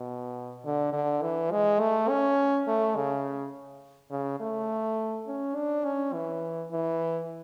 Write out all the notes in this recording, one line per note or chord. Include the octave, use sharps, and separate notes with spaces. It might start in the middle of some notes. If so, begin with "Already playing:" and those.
Already playing: B2
D3
D3
E3
G#3
A3
C#4
A3
C#3
C#3
A3
C#4
D4
C#4
E3
E3